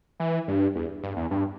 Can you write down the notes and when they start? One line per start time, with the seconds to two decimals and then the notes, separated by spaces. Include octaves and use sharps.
0.20 E3
0.48 G2
0.76 E2
1.03 G2
1.17 E2
1.31 G2